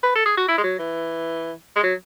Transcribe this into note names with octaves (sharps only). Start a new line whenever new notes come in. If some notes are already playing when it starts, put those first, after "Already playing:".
B4
A4
G#4
F#4
E4
G#3
F#3
E3
G#3
F#3